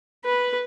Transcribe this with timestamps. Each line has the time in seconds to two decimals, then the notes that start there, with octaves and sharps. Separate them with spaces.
0.25 B4